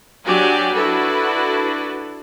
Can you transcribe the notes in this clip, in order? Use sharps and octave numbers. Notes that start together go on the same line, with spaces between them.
F#3 D4 F#4 G4 D5 G#5
D4 E4 F#4 A4 B4